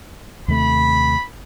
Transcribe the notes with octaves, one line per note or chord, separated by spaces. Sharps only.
D#2 C3 A3 B5